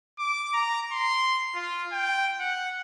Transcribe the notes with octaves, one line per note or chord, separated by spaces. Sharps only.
D6
A#5
C6
F4
G5
F#5